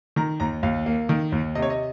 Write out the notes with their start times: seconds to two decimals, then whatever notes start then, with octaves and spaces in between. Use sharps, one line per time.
0.16 D#3 A#5
0.40 D#2 A#5
0.63 D#2 F5
0.86 A#3
1.09 D#3
1.32 D#2
1.55 C3 D#5
1.62 C#5
1.70 D#5